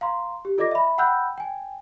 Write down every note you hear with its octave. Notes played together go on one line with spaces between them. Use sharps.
F5 A#5 C6
G4
F4 A4 D5 D#5 D6 A#6
E5 B5
F#5 G5 B5 E6 F#6 G6
G5 G#5